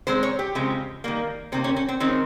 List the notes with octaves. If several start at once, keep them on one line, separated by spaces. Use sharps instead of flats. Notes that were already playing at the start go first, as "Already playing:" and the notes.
D#3 G#3 C4 C5
C#5
G4
C#3 F3 G#3 C4
D#3 G3 A#3
C3 D#3 A#3 C4
C#4
C#4
C4
D#3 G#3 C4 C#4